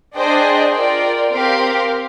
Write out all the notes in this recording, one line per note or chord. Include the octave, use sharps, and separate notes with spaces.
D4 G#4 C5 D#5 G5
F4 A#4 D5 G5
C4 G4 A#4 F5